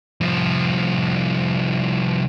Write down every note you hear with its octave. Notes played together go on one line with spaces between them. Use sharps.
C2 F3